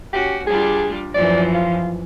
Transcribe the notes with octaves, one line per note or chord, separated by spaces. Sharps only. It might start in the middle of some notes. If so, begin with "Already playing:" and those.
C#4 F#4 G4
G3 D4 F4 G#4
F#2 E3 F3 D5
F4